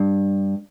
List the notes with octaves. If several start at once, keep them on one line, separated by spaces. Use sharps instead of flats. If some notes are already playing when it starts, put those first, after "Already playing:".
Already playing: G2